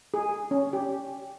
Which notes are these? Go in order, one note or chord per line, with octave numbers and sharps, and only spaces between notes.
G#4
C#4
G4